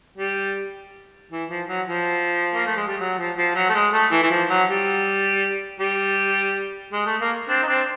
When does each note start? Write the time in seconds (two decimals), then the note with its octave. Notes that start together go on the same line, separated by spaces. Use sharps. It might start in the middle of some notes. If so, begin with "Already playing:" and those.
0.18 G3
1.31 E3
1.49 F3
1.68 F#3
1.87 F3
2.54 A#3
2.66 A3
2.76 G#3
2.87 G3
3.00 F#3
3.18 F3
3.37 F3
3.55 F#3
3.69 A3
3.74 G#3
3.92 A3
4.11 E3
4.22 E3
4.30 F3
4.49 F#3
4.68 G3
5.80 G3
6.93 G#3
7.06 A3
7.21 A#3
7.48 C4 D4
7.63 D#4
7.67 C4 D4